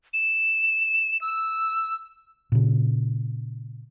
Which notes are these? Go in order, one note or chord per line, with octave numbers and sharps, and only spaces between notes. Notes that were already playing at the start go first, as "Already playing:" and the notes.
E7
E6
A#2 C#3